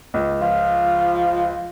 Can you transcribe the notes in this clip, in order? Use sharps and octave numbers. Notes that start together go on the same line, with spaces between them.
C#2
F3 F4